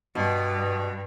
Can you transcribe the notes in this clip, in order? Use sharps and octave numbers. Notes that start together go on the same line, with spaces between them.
G2 B2